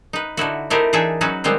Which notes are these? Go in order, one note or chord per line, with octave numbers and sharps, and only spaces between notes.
D#4 B4
D3 D#4 E4 F#4
A3 C4 D#4 E4 G4 A#4
E3 D4 D#4 G#4 E5
F#3 C#4 D#4 F#4 B4
D#3 G3 G#3 B3 C4